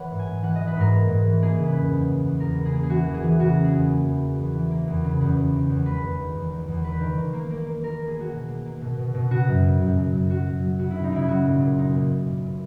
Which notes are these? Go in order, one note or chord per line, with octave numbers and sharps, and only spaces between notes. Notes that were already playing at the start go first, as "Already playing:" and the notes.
Already playing: E3 A#3 B4 C#5 F#5
G#2
G#5
G#2
E3 F#5
E3 D#5
B4
G#2 A#4
A#3
G#2
E3
A#3 G#4
C#3
B4
E2
E2
E2
E2
E2 A#4
C#3
G#4
A#3
G#4
E3 F#4
E3
G#4
E3
C#3 F#4
A#3
G#4
E2
A#3
E2
A#3
E2
E3
A#3
E2
C#3
E2
E2
D#3
E2
G#3 B4
E2
D#3
E2
D#3
E2
D#3 B4
D#3
D#3
A#3
A#3
A#3
A#3 A#4
A#3
G#4
A#3 F#4
B2
A#3
A#3
B2
B2
B2
C#3 F#4
F#2
C#3
F#2
F#2
F#2
F#3 F#4
F#2
F#3
C#3 F#4
C#3 E4
D#4
C#3 E4
F#3 F#4
A#2
A#2
A#3 D#4
A#2
A#2
A#2
A#2